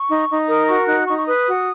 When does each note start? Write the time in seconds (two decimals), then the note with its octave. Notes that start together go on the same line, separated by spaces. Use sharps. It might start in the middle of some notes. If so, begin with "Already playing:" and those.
Already playing: C#6
0.09 D#4
0.28 D#4
0.48 A#4 D#6
0.68 F#4 C#6
0.87 D#4 F#6
1.08 D#4 C#6
1.18 C#6
1.26 B4 D#6
1.47 F#4